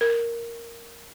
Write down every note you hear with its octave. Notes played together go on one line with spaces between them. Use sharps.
A#4